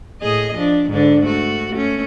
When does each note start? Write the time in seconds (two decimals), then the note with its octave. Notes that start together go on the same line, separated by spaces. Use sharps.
0.21 A2 G#4 D#5
0.55 F3 D4
0.90 G#2 D3 D4
1.25 A3 F#4
1.72 A3 C#4